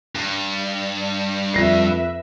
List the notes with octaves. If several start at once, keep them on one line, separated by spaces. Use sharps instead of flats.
G2
F2 B4 E5 A#6 C7